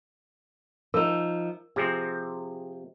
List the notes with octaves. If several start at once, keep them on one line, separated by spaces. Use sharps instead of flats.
F3 D#4 A#4
C3 F3 C4 G#4